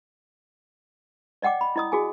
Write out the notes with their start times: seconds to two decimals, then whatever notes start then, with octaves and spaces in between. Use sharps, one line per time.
1.42 D5 D#5 F#5 G5 D6
1.61 B5
1.76 E4 D#5 D#6
1.92 F#4 G#4 G#5